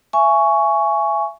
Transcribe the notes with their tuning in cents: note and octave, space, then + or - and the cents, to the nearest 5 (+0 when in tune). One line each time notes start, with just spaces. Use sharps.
E5 +30 G#5 +5 C#6 +10